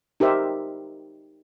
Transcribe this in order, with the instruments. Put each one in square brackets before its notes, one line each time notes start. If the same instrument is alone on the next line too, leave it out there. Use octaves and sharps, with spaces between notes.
[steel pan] D#4 G4 A#4 C5 E5